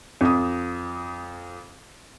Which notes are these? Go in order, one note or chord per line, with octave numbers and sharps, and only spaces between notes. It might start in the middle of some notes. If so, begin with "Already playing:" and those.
F2 D#6